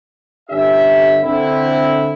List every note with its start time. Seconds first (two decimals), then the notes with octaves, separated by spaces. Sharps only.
0.50 G1 D3 C#4 G4 E5
1.24 D3 C4 E4